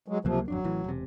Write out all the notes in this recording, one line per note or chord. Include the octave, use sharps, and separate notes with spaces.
F#3 G#3
C#2 C3 F3 F#3 A#3
G#1 F2 F#3 D4
A1 A2 E3
E1 C3